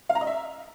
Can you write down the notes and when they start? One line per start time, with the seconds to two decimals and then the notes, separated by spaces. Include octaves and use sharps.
0.09 F5
0.15 A#5
0.21 D#5
0.27 E5